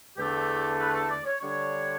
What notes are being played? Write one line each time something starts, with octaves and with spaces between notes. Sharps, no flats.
E2 D3 A3 G4
B4
A4
D5
C#5
D3 G3 D4 C#5